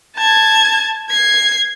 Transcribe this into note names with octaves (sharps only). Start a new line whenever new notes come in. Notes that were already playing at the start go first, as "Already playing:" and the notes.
A5 G#6
G#6 C7